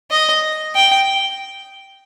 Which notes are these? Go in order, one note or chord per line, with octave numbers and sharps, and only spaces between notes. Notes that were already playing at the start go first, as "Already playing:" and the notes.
D#5
G5